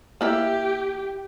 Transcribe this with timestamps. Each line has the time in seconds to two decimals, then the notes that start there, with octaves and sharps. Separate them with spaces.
0.21 A#3 E4 G4 E5